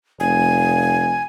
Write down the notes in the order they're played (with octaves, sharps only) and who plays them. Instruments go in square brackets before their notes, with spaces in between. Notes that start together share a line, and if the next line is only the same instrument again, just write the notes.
[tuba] F1 [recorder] G#5